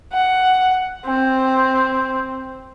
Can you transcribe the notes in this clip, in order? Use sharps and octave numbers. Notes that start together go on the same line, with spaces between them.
F#5
C4